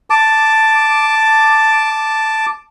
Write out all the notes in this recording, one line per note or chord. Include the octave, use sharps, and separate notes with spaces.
A5 D6